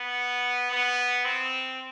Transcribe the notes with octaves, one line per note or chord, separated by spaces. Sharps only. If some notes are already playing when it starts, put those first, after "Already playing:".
Already playing: B3
B3
C4